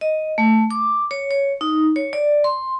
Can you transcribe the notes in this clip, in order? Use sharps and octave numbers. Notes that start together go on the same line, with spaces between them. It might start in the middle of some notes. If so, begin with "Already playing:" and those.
D#5
A3
D6
C#5
C#5
D#4
C#5
D5
C6